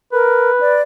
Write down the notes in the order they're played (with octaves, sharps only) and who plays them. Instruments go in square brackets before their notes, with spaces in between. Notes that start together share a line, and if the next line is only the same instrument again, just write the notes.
[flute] A#4 [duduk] B4
[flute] D5